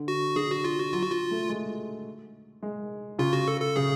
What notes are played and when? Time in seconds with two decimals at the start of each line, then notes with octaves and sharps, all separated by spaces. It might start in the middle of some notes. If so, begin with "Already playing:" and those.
Already playing: D3
0.08 F#4
0.36 D3 G#4
0.51 F#4
0.65 F4
0.79 F#4
0.93 F#3 F4
1.03 F#4
1.11 F4
1.31 A3
1.49 G#3
2.63 G#3
3.19 C#3 F4
3.33 F#4
3.48 A4
3.61 A4
3.76 C#3 G#4